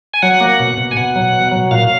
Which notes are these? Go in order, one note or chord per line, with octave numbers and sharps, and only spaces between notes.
G#5
F#3 F#5
A#3
B2
B2
G#5
B2 F#5
F#3
B2
F#3
A#2 F5